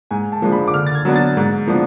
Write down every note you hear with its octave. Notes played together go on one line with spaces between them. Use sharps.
G#2 G#5
A5
F3 G#3 D4
B5
D6
D3 F6
A6
G#6
F#3 B3 D4
A6
G#2
F3 B3 D4